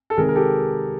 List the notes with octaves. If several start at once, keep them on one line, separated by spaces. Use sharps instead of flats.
A4
C3 D#3 G#3 G#4 A#4
A#4
G4 A4